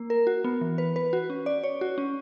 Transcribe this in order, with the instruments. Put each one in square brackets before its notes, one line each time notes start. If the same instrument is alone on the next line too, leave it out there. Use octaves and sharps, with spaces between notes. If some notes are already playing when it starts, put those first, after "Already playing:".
Already playing: [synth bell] A#3
A#4
F#4
B3
E3
B4
B4
F#4
C#4
D5
C#5
F#4
C#4